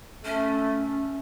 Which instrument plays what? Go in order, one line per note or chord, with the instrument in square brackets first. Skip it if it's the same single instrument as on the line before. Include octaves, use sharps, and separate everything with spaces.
[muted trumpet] A3 [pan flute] C#4